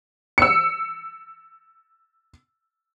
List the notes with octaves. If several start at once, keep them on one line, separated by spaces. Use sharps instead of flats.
E6 C#7